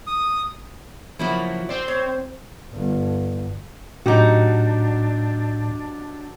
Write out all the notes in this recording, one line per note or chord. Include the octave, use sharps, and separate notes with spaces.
D#6
C#3 F3 F#3 A#3 E4 F#4
C4 C5 D5
C#5
G1
A2 F#3 D4 D#4 F#4 G4